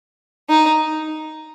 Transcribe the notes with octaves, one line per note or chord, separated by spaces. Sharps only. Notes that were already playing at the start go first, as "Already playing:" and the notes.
D#4